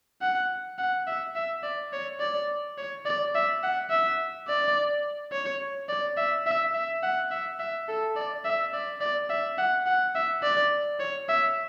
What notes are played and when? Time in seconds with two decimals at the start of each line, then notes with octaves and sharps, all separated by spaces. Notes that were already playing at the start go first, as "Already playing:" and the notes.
0.22 F#5
0.79 F#5
1.07 E5
1.36 E5
1.63 D5
1.93 C#5
2.21 D5
2.78 C#5
3.06 D5
3.35 E5
3.63 F#5
3.90 E5
4.48 D5
5.32 C#5
5.89 D5
6.17 E5
6.47 E5
6.74 E5
7.03 F#5
7.31 E5
7.59 E5
7.88 A4
8.16 D5
8.45 E5
8.73 D5
9.01 D5
9.30 E5
9.58 F#5
9.86 F#5
10.15 E5
10.43 D5
11.00 C#5
11.29 E5